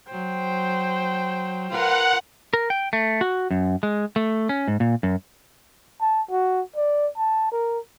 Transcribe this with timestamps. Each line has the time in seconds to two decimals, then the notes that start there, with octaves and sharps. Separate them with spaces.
0.11 F#3 C5 G5
1.71 F4 A#4 B4 F#5
2.53 A#4
2.70 G5
2.93 A3
3.21 F#4
3.51 F#2
3.83 G#3
4.16 A3
4.49 C#4
4.68 G#2
4.80 A#2
5.03 F#2
6.01 A5
6.31 F#4
6.76 D5
7.17 A5
7.52 A#4